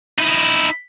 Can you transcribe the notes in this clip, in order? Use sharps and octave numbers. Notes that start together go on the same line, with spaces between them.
D#4 E4